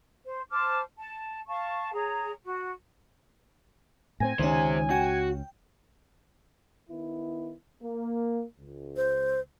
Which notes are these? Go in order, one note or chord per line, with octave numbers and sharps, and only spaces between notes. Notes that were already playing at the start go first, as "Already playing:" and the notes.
C5
C5 A5 D6 F6
A5
F5 A5 C#6
G#4 C#5 A#5
F#4
A2 B3 C4 G#5 A#6
C#2 D#3 F#3 C#4 D#4 G4 C5
F#4 G5
D#3 B3 E4
A#3
C#2
C5